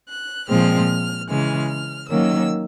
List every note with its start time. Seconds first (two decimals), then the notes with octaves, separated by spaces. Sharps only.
0.09 F#6
0.49 A#2 F3 G#3 C4 F6
1.29 C#3 E3 G#3 F6
1.70 F6
2.09 D#3 F#3 A#3 C#4 E6